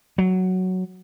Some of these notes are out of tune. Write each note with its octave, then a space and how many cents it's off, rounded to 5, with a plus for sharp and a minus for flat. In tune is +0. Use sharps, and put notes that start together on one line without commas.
F#3 +5